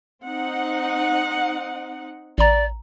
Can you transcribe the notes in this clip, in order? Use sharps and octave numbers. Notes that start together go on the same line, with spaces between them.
C4 D#4 F#5
A1 D5 A#5